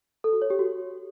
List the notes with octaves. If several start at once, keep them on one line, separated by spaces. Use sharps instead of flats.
A4
F#4
C#5
G4
F#4